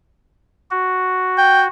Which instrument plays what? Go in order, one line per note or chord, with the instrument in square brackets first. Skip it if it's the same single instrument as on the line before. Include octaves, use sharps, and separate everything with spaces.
[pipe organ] F#4
[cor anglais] G5